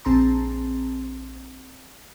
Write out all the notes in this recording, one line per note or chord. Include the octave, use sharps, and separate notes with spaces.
A#1 C4 G#4 A5 A#5 C6